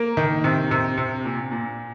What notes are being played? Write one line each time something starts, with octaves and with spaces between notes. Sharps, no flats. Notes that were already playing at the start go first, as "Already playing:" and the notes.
Already playing: A#3 A#5
D#3
C3
C3
C3
A#2
A#2